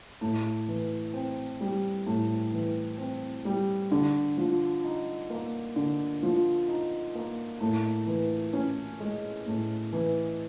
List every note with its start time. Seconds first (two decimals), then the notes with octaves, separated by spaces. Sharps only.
0.21 A2
0.68 E3
1.14 C4
1.61 G3
2.07 A2
2.53 E3
2.98 C4
3.45 G3
3.91 D3
4.37 F3
4.84 D#4
5.30 A#3
5.76 D3
6.23 F3
6.68 D#4
7.15 A#3
7.61 A2
8.07 E3
8.53 C#4
9.00 G#3
9.47 A2
9.93 E3